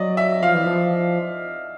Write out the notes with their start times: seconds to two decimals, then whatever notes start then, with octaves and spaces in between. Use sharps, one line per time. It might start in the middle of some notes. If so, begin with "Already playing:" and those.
Already playing: F#3 D5 D#5
0.17 E5
0.42 F3 F5
0.55 E3
0.66 F3